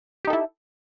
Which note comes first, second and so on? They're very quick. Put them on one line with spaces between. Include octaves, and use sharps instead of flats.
G4 D#4 A4 E4